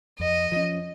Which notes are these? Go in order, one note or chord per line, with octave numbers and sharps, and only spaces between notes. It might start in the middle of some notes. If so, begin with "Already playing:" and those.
F2 D#5
F3 C#4